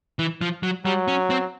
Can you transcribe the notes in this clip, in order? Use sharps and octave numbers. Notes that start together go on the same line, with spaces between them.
E3
F3
F#3
F#3 G3
C#4
C4